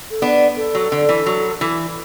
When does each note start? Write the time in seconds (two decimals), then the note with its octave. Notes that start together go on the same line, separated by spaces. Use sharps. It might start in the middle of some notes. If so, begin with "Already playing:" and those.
0.11 A4
0.22 B3 D4
0.57 A4
0.75 F#3
0.92 D3
1.09 E3
1.26 F#3
1.61 E3